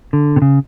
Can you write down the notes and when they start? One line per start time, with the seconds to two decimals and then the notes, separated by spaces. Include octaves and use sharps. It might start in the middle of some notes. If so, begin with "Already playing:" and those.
0.13 D3
0.36 C3
0.42 C#3